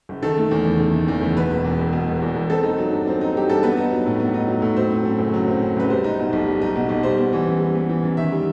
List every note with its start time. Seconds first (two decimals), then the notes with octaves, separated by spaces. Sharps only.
0.09 F#1
0.23 D#3 A4
0.38 A3
0.51 E2
0.65 F#1
0.80 D#3
0.94 A3
1.08 E2
1.21 F#1
1.37 B2 B4
1.50 E1
1.64 E2
1.79 E1
1.93 B2
2.08 E1
2.22 E2
2.35 E1
2.50 C4 A4
2.63 D#4
2.78 F#3
2.92 G2
3.07 C4
3.21 D#4
3.35 F#3 G4
3.49 G2 A4
3.63 B3 B4
3.77 D#4
3.91 F#3
4.06 A2
4.20 B3
4.34 D#4
4.48 F#3
4.62 A2
4.76 F#3 C5
4.90 C4
5.05 F#2
5.19 F#1
5.34 F#3
5.48 C4
5.62 F#2
5.77 F#1 B4
5.90 G3 C5
6.04 D#4
6.19 B2
6.33 B1
6.47 G3
6.62 D#4
6.75 B2
6.89 B1
7.03 G3 C5
7.19 B3
7.33 E3
7.47 F#2
7.60 G3
7.75 B3
7.89 E3
8.03 F#2
8.17 D#3 E5
8.32 G3